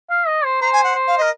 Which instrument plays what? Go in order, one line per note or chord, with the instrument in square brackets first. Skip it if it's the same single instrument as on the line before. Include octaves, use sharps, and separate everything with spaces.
[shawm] F5
D#5
C5
[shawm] C5 [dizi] A#5
[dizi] G#5
F#5
[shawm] C5
[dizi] F5
[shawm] A#4 [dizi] D#5